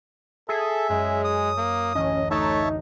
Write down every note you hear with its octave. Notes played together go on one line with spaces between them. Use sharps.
G#4 A4 E5
F#2 G#3 C#4 G6
D#6
A#3
A1 D2 C#4 D#5
A3 D#4 C#5 E5 A5